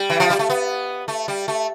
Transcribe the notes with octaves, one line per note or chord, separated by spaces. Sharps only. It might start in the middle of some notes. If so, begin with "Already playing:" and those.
Already playing: G3
E3
F3
G3
A3
B3
A3
G3
A3